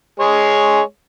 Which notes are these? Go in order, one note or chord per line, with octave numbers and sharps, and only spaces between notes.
G#3 G#4 C#5